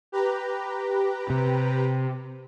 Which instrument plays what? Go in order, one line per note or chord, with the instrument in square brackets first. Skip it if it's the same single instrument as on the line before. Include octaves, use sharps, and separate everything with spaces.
[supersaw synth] G4 B4 A#5
[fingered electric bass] C3